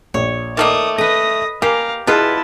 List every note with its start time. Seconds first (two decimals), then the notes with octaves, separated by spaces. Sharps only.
0.14 A#1 C#5
0.57 D#3 A3 A#3 D6 D#6
0.98 A4 B4 D#5 D#6 A#6
1.62 A#3 G4 F5 G#5 A#5
2.07 B2 B3 E4 F4 G#4 B4 A5